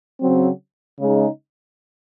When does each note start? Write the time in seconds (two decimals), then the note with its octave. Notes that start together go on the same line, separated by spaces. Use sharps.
0.21 C#3 F#3 C4
1.00 C#3 G#3 D#4